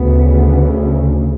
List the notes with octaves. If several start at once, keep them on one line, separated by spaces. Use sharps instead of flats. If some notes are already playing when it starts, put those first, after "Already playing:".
Already playing: D2 C#3 B3